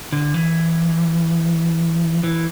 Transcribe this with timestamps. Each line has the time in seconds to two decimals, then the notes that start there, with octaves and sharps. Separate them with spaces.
0.12 D3
0.34 E3
2.23 E3